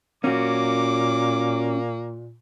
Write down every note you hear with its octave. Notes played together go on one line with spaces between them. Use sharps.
A#2 A#3 C#4 F#4 D6